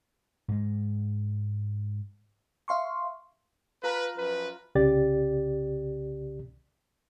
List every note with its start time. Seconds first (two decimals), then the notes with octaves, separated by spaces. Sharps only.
0.48 G#2 G#3
2.68 E5 F5 C6 C#6
3.83 F4 A#4 B4 A5
4.17 F#2 F3 B4
4.75 C2 C#3 G4 D5 A6